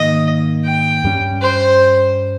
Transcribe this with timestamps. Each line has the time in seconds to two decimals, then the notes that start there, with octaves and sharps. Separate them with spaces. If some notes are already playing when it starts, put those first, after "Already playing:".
Already playing: G#2 D#3 A#3 D#5
0.65 G5
1.04 G2 G3 C#4
1.42 C5